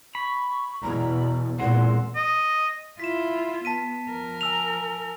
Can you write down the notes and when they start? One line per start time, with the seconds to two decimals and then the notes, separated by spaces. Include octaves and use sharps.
0.15 B5 C#6
0.82 E2 B2 A#5
1.60 E2 A#2 G#3 C4 F#5
2.16 D#5
3.00 E4 F4 B6 E7
3.65 B3 A5 B6 D#7
4.10 F3 A#4
4.41 G#5 E6 F7